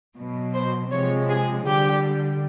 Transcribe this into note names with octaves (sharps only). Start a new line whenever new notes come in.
B2 F#3
C5
C3 F3 G#3 C#5
G#4
D3 G3 G4